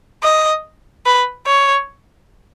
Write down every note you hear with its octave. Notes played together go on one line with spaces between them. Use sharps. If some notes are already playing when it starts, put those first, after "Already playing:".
D#5
B4
C#5